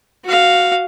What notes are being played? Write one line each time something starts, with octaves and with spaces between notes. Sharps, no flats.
F#4 F5